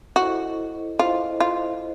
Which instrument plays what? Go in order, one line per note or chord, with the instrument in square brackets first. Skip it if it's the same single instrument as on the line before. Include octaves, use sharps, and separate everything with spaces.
[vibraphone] E4 A4 C5 D#5 [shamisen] F#4
[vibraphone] E4 A4 C5 D#5 [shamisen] F4
[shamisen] F4